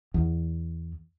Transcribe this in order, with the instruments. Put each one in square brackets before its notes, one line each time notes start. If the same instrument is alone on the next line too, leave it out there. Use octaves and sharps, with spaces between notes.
[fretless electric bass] E2